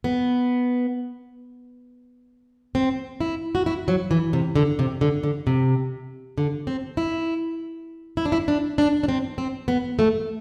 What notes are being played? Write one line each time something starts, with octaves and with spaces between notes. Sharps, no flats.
B3
C4
E4
F#4
E4
F#3
E3
C3
D3
C3
D3
D3
C3
D3
C4
E4
E4
D4
E4
D4
D4
D4
C4
C4
B3
A3